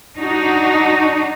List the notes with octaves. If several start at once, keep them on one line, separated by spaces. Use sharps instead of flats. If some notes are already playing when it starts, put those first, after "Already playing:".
D4 D#4 F#4